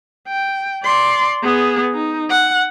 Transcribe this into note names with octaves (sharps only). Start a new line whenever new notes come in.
G5
D5 C6
B3 G#4
D#4
F#5